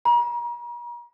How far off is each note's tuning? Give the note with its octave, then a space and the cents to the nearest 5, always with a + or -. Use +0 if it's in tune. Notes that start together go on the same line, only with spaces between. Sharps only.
A#5 +40